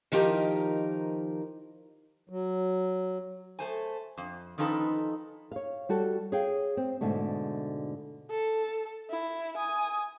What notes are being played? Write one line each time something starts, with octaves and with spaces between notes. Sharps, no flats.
D#3 F3 D#4 G4 A#4
F#3
A3 C5 G#5
F2
D#3 F3 C#4 D#4 A4 B4
C#5 F5
G3 F#4 A4
G#4 C#5 F5 G5
C4
G#2 B2 D3 A3
A4
E4
G#5 D#6